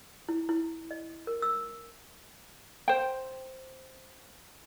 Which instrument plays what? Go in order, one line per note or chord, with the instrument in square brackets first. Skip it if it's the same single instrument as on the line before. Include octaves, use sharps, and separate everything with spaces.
[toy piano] E4
E4
D#5
A#4
E6
[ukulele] C5 G5